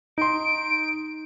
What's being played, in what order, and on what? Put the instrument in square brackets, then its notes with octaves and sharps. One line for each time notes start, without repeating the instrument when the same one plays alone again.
[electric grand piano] D#4 C6 [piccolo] D7